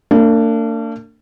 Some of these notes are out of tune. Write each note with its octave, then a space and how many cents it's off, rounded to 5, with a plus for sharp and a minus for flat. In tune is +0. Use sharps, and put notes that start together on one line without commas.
A#3 -45 D4 +0